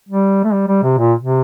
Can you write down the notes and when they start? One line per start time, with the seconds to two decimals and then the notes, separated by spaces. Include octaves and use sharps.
0.09 G3
0.44 A3
0.53 G3
0.68 G3
0.83 C3
0.98 A#2
1.21 C3